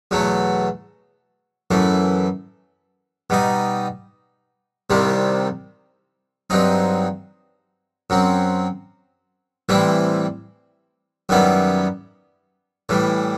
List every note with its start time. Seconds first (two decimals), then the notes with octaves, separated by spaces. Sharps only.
0.11 E2 B2 F#3 A3
1.71 F#2 E3 A3
3.30 B2 G3 D#4
4.90 C2 C3 D#3 G3 C4
6.50 G2 F#3 C4 D#4
8.10 F#2 F#3 C4
9.69 A2 E3 G3 C4 E4
11.29 F#2 D#3 G3 B3 E4
12.89 A2 E3 G3